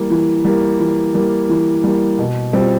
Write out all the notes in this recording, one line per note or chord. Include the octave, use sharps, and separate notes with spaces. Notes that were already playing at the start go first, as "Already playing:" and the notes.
Already playing: E3 G3 A#3
E3
G3 A#3
E3
G3 A#3
E3
G3 A#3
B2
G3 C4 F4